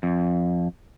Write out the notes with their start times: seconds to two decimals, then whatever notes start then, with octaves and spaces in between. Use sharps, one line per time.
0.03 F2